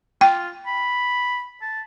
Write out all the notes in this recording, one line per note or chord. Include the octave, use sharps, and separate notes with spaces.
F4 G5
B5
A5